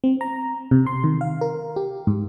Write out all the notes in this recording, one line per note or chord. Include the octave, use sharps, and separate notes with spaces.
C4
A#5
C3
C6
D#3
F5
A#4
G4
G#2